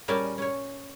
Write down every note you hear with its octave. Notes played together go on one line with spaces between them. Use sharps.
A#2 G3 C#4 A#4 G#5 A5
C#4 C#5